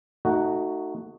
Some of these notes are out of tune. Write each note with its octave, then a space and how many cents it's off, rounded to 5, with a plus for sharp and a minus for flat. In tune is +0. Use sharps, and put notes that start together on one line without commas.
A3 +30 D#4 +0 F#4 +0